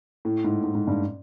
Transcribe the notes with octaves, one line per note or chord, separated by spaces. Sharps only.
A2
G#2
G#2
G#2
G2